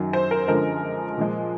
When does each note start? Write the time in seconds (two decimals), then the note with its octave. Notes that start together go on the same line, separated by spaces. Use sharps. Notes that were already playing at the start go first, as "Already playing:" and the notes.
Already playing: F#2 D#3 F#3
0.13 C5
0.31 A#4
0.48 F#2 D3 F3 G#3 A#4
1.17 A#2 F3 G#3